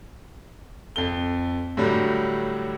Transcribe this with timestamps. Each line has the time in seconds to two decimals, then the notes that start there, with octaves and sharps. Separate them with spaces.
0.96 F2 A4 G7
1.77 A2 D3 F#3 G3 A3